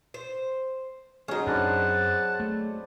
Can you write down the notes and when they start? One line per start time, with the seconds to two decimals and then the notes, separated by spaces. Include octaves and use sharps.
0.14 C5
1.28 F#3 G#3 C#4 D#4
1.47 F#2 C4 D4 B4 F#5 A5
2.40 A3